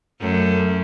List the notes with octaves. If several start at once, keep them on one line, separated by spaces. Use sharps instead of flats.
F#2 A3